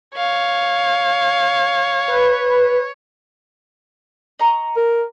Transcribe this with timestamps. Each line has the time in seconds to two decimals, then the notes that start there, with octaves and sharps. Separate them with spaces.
0.16 C#5 F5
2.08 B4
4.39 D#5 A#5 C#6
4.76 A#4